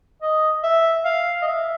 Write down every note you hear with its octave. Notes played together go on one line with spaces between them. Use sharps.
D#5
E5
F5
D#5
E5